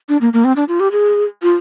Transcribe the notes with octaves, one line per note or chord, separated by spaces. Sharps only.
D4
A#3
A#3
C4
D4
F4
G4
G#4
F4